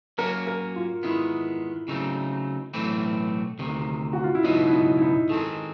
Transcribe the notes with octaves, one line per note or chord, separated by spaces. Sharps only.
F#3 A#3 C#4 F#4 A#4
A#4
F4
D#3 G#3 B3 E4
C#3 F#3 A3 C4 D#4
B1 A2 E3 A3 C4
D2 C3 D#3
F#4
F4
E4
C#2 B2 F#3 B3 D#4
E4
D#4
E4
D#4
D#3 G#3 C4 A4